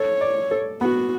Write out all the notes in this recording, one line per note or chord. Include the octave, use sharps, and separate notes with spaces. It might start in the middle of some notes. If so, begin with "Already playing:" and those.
Already playing: A4 C#5
D5
A4
B3 F#4